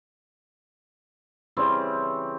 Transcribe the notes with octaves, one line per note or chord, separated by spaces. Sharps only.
C#3 E3 G3 C4